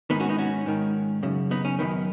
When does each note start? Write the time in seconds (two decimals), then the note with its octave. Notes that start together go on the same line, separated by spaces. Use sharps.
0.10 G#2 D#3 B3 D#4
0.20 C#4 F#4
0.29 B3 D#4
0.39 C#4 F#4
0.66 G#2 D#3
1.23 F#2 C#3
1.51 B3 D#4
1.65 C#4
1.79 F#2 D#3 B3